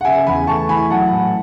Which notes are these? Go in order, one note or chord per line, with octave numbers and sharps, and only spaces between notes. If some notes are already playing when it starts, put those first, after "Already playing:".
F#5
C#3 E5 G#5
E2 G#5 B5
A3 A5 C#6
E3 G#5 B5
F#3 F#5 A5
A2